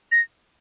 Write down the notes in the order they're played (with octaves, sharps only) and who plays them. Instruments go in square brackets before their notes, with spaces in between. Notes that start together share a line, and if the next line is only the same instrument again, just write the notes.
[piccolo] A#6